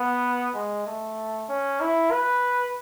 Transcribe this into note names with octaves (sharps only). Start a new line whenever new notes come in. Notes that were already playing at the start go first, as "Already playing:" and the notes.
Already playing: B3
G#3
A3
C#4
E4
B4